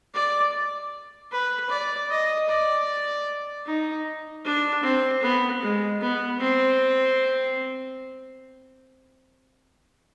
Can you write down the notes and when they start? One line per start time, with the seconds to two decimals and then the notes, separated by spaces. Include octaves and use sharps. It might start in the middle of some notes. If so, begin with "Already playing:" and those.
0.14 D5
1.31 B4
1.70 D5
2.10 D#5
2.49 D5
3.66 D#4
4.45 D4
4.83 C4
5.22 B3
5.62 G#3
6.01 B3
6.40 C4